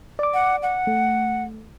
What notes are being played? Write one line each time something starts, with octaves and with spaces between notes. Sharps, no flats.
D5 D6
F#5
F#5
A3